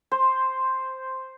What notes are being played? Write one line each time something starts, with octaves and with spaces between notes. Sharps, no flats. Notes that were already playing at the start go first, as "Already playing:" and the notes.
C5